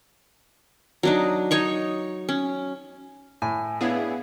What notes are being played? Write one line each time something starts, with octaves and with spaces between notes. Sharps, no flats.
F#3 D4 D#4
D#4 C#5 C#6
C#4
A2 G#5
B3 D4 E4 G#4 C#5 F5